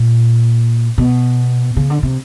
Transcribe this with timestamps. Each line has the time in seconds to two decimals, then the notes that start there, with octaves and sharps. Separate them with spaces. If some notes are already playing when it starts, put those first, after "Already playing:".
Already playing: A#2
0.98 B2
1.77 C#3
1.90 D3
2.03 C3